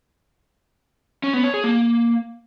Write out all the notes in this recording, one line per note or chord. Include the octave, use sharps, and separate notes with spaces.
C#4
B3
C#5
G#4
A#3